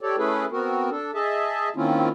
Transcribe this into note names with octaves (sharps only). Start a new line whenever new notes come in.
G4 A4 C#5 D5
A3 C#4 E4 G#4 A4 B4
B3 C4 F#4 A#4
D4 A4
G#4 D#5 E5 A5
D#3 A#3 C4 C#4 E4 F4